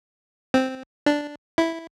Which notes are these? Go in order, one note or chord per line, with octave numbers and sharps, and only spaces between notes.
C4
D4
E4